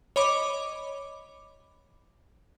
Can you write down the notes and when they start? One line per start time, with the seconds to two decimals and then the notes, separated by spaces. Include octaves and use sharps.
0.16 C#5 D#5 B5 D6